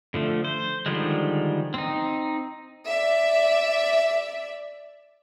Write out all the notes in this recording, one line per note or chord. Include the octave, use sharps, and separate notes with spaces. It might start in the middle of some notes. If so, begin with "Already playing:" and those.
D3 F3 A3
C5
D3 D#3 F3 G3 G#3
C4 D#4
D5 E5